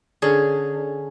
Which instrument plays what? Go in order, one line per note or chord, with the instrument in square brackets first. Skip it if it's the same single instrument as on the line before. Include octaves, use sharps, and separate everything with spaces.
[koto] D3 C#4 G#4